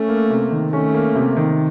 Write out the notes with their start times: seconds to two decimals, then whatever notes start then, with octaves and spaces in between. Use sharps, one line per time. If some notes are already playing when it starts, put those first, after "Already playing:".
Already playing: A3 C#4
0.09 A#3
0.30 C3
0.51 D#3
0.73 A3 C#4
0.94 A#3
1.15 C3
1.37 D#3